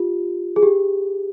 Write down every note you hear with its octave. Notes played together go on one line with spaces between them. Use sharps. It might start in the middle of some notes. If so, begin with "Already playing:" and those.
Already playing: F4 G4
G#4
G4